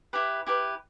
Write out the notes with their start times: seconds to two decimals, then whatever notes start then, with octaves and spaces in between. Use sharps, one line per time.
0.13 E4 G4 B4
0.47 E4 G4 B4